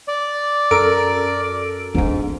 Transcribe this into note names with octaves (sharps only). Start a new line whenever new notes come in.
D5
F#2 A4 A#4 D7
G#2 D4 D#4